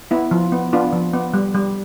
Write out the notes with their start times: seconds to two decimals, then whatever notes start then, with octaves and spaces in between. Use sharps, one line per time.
0.11 B3 E4
0.31 F3
0.52 B3
0.73 B3 D4 F4
0.93 F3
1.13 B3
1.34 G3
1.54 G3